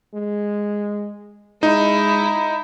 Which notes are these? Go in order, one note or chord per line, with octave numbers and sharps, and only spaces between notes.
G#3
G#3 D#4 E4